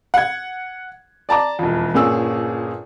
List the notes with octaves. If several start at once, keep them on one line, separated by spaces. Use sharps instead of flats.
F#5 G#6
D5 A5 A#5 D6
E1 F2
G1 A#2 C#4 G#4 E6